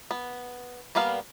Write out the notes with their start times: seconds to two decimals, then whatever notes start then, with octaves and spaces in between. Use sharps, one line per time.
0.11 B3
0.95 G3 A#3 B3 F5